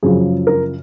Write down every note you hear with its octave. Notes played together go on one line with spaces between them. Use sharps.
F#2 C#3 F3 G#4
A#4